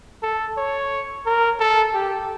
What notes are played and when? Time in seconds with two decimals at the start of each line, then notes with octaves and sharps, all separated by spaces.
0.23 A4
0.57 C#5
1.26 A#4
1.60 A4
1.94 G4